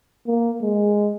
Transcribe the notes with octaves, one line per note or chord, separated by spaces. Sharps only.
A#3
G#3